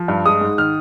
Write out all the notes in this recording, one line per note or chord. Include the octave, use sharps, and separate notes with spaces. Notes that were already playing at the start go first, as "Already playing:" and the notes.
Already playing: F3
G2
G#3 D#6
G#2
D#3 F6